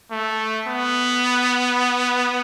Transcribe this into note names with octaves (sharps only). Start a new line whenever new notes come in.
A3
B3